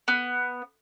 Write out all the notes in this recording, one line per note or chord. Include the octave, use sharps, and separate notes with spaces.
B3